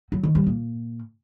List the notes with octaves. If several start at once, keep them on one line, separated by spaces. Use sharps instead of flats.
F#3
D#3
G3
A#2